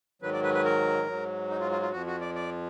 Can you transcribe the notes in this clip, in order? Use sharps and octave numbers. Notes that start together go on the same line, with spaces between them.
G#2 D#3 F#3 B4
D5
B4
B4
A#4
G#2 F#3
D#4
F4
F4
F4
F2 F3 F#4
F#4
D5
D5